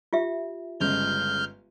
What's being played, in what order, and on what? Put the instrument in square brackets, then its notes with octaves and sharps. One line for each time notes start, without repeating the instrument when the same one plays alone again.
[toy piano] F4 G4 E5
[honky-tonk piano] G1 C#3 G#3 [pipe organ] F6 G6